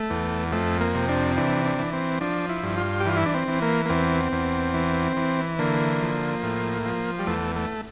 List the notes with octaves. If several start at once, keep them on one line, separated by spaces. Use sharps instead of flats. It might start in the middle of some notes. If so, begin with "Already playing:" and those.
Already playing: A3
E2
F2 A3
A#3
C3
D4
E3 D4
D4
E3
C4
F3 D4
E4
G2
F4
G4
E3 F4
E4
D4
C4
E3
A#3
A#3
E2 C4
E2
E3
E3
D3 A#3
F3
A2
F3
G3
E2 A3
A3